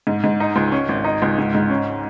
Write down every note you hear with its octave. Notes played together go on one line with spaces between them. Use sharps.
G#2
G#2
D#4
C#2
C#4
G#1
D#4
C#2
G#2
G#2
C#4